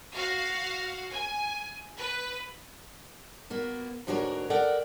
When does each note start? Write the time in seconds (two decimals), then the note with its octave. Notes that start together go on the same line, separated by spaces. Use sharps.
0.14 F#4 F5
1.12 G#5
1.96 B4
3.50 A#3 B3 F#4
4.07 D2 G#2 D4 F#4 A#4 C#5
4.50 A4 A#4 D5 F#5 G5